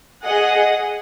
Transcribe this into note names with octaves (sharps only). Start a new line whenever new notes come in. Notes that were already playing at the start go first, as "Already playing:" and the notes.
G#4 D#5 F#5